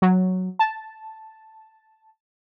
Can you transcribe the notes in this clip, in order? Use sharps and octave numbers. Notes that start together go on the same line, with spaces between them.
F#3
A5